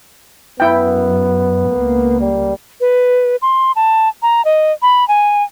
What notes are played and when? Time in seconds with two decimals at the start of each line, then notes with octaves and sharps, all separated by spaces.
0.60 F#2 B3 E4 G5
1.71 C#2 A#3
2.21 G3
2.81 B4
3.42 C6
3.76 A5
4.22 A#5
4.45 D#5
4.82 B5
5.08 G#5